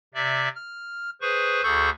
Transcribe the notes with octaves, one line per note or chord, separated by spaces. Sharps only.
C3 D5 E5
F6
G#4 B4 C5 C#6
D2 G#4 A4 C#6 G6